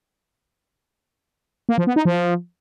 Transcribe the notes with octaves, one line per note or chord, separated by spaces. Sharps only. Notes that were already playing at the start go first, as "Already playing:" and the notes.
A#3
F3
B3
D#4
F3